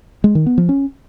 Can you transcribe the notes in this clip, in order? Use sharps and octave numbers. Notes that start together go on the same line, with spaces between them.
G#3
D#3
B3
F3
C#4